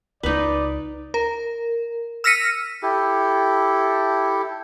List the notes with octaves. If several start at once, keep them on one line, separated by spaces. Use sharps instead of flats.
C#2 D#4 E4 B4 D5
A#4
E6 F6 A#6 B6 C#7 D#7
E4 G4 A4